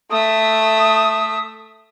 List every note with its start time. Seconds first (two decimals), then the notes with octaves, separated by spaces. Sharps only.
0.11 A3 E5 D#6